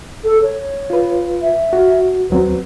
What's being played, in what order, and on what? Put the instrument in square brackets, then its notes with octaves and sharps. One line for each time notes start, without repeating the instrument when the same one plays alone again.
[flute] A4
C#5
[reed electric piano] F4 B4
[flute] E5
[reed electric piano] F#4
[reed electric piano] D#2 F#3 C4 [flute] B4